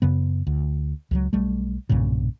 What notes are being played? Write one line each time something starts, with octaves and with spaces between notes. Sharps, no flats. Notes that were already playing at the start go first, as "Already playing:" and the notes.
F#2 C#3 B3
D2
C#2 F3 F#3
B1 G3 A3
B1 G2 A#2 C#3